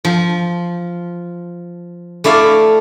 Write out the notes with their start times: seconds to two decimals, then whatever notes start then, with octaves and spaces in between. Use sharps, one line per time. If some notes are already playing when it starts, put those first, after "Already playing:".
0.05 F3
2.24 A3 E4 D5 F5